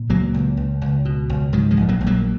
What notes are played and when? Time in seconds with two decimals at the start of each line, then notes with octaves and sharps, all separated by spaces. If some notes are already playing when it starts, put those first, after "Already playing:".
Already playing: A#2
0.10 C#2 F#3 A#3
0.34 C#2
0.57 C#2
0.81 C#2
1.05 B2
1.30 C#2
1.53 G#2 D#3 F#3
1.71 F3 G#3
1.77 A#1
1.89 F#3 A#3
2.01 A#1
2.07 F#3 A#3